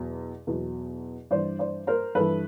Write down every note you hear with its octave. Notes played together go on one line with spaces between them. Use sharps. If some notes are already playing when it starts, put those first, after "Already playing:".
Already playing: E2 B2 F#3
E2 B2 F#3
G2 E3 C5 D5
C5 D5
A#4 C5
G2 E3 A4 B4